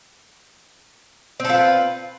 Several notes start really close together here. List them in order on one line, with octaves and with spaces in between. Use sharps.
C4 A4 F4 B4